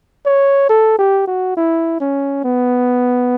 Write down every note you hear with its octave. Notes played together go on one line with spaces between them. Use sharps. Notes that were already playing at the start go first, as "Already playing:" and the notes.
C#5
A4
G4
F#4
E4
C#4
B3